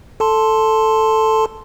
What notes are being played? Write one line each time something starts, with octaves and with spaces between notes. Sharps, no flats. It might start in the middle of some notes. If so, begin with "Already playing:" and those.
A4 A5 C6